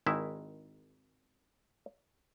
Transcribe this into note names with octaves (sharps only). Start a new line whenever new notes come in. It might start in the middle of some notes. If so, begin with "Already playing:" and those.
G#1 D#3 G#3 E4 E5